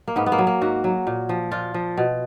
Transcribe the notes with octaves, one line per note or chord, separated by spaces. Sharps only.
A#3
G#2 B3
B3
A#3
F#3
A#3
G#2 F#4
F#3
A#2
F3
A#2 F4
F3
B2